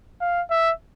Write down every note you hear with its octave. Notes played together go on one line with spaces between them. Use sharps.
F5
E5